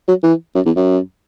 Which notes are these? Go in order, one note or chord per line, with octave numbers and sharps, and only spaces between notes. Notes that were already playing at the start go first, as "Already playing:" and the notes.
F#3
E3
F#2
E2
F#2